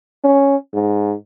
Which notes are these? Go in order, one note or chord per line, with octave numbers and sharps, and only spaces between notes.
C#4
G#2